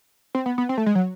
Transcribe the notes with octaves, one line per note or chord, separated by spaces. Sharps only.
C4
B3
B3
C4
A3
G#3
F#3